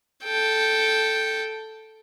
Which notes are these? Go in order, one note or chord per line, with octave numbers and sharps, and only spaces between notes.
A4 G5